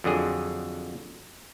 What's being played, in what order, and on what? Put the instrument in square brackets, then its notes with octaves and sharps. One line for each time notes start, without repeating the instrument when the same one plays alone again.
[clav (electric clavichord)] F2 D3 F#3 G#4